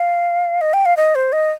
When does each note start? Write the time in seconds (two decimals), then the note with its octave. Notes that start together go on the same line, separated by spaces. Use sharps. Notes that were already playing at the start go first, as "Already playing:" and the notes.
Already playing: F5
0.61 D#5
0.73 G5
0.86 F5
0.97 D#5
1.15 C5
1.33 D#5